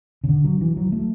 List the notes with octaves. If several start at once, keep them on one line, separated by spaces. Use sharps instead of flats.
C#3
D3
F#3
E3
F#3
A3